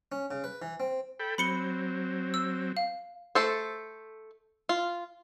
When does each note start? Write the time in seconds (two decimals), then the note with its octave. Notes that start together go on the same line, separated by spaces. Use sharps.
0.12 C#4
0.31 C#3
0.44 B4
0.62 E3
0.80 C4
1.20 A4 G5 B5
1.38 F#3 C4 B5 C#7 G7
2.34 E6
2.77 F5
3.35 A3 A4 C5
4.69 F4